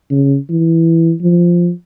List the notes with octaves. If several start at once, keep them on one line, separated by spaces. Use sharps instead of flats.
C#3
E3
F3